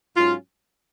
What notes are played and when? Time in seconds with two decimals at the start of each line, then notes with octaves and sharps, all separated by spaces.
0.16 G#2 F#3 C#4 F4